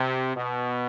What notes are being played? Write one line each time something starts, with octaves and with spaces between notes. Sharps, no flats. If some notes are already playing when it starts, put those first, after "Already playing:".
Already playing: C3
B2